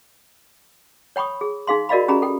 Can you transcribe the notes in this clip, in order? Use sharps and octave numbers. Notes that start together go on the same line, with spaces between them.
C#5 G5 B5 C#6 D#6
G#4
D#4 G#4 F5 C6
F#4 A#4 D5 D#5 F5 B5
C#4 G4 G#4 A#5 B5
A4 G5